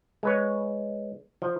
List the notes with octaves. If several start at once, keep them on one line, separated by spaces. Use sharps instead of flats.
G#3 B4 C#5
F3